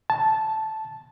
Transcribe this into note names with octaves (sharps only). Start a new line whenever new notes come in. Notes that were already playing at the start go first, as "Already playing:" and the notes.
A5